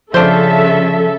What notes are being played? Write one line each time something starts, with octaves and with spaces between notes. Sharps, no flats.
C#3 F3 D4 A4 C5 E5